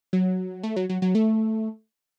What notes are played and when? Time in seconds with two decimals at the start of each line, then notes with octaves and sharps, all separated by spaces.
0.13 F#3
0.63 A3
0.76 F#3
0.89 F#3
1.02 F#3
1.15 A3